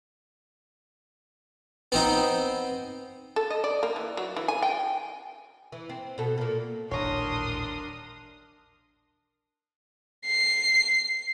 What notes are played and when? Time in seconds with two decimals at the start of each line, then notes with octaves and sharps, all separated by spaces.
1.92 B3 C4 D#4
3.36 A4
3.50 D#5
3.64 D5
3.83 A#3
3.96 E3
4.17 F#3
4.37 E3
4.48 G#5
4.62 G5
5.72 E3
5.90 C4
6.18 B2 A4
6.38 A#2 A#3
6.91 D#1 A1 D4 A#4 C#5 A#5 C6 D#6
10.26 C7